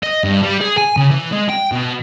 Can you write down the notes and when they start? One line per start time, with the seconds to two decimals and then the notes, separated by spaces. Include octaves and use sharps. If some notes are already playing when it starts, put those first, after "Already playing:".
0.03 D#5
0.24 G2
0.42 G3
0.61 G#4
0.78 G#5
0.97 C#3
1.11 E3
1.33 G#3
1.50 G5
1.72 B2